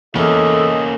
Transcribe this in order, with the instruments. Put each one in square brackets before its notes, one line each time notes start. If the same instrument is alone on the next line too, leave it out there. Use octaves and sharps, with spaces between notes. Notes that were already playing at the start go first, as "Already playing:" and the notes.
[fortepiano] E2 [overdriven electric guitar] A#3 C#4 [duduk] A4 [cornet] D#5